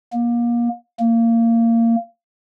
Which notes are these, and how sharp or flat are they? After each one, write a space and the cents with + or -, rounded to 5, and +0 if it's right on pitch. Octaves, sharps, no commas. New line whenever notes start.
A#3 +30
A#3 -20